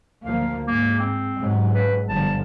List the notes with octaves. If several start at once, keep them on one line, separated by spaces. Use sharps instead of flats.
D2 F3 A#3 F5
G#2 A#3
C4
G#2 C#3 F#3
B4
G1 D3 F3 A5